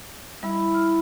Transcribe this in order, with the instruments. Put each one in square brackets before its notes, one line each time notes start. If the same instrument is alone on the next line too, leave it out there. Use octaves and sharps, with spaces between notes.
[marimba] G3 [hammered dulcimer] E4
[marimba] F6